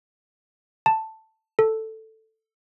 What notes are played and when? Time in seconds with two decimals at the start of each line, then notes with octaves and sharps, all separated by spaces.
0.86 A5
1.59 A4